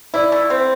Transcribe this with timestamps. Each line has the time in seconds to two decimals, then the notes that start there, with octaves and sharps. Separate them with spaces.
0.14 E4 D5
0.32 A3
0.50 C4